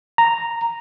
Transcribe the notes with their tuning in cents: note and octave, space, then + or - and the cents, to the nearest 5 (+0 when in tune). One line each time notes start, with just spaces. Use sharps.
A#5 -5